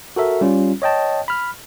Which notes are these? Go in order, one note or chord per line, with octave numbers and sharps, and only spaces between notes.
F#4 A4 A#4 E5
G3 C#4 F4
C#5 D#5 G5 A5
B5 F6